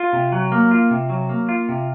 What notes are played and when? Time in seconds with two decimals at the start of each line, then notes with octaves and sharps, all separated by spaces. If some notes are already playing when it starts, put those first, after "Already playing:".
Already playing: F4
0.13 C3
0.32 F#3
0.52 A#3
0.71 F4
0.91 C3
1.09 F#3
1.29 A#3
1.49 F4
1.69 C3